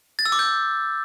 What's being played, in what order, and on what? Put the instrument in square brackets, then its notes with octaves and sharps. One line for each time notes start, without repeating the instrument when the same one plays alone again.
[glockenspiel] A6
E6
D6
G6